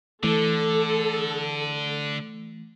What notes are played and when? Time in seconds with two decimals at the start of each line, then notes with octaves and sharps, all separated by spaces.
0.23 D3 E3 A3 A4